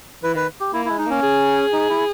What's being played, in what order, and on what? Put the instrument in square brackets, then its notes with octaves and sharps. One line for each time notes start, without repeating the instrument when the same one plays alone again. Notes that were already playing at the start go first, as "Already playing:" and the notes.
[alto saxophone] E3 [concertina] B4
[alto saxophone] D#3 [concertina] B4
[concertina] G4
[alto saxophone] A#3 [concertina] E4
[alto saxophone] G#3 [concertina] E4
[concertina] D#4
[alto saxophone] A#3 [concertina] C#4
[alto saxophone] G#4
[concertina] D#4
E4